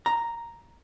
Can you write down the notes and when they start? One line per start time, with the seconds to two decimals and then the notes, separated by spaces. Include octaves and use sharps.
0.06 A#5